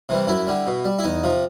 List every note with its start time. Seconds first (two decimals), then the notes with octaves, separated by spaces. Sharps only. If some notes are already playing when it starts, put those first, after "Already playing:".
0.09 C3 E3 G3
0.27 F#2 E4
0.47 D3 G3
0.67 B2
0.84 G3
0.99 E4
1.04 E2 D#4
1.24 C3 F3